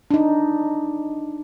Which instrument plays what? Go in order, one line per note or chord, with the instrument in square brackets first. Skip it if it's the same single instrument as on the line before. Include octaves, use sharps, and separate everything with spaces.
[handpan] D4 D#4